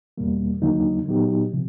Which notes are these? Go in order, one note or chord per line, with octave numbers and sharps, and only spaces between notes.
E2 B2 G3 A#3
D#2 D3 F#3 A#3 D#4
A#2 F#3 B3 D#4 G4
C3 F3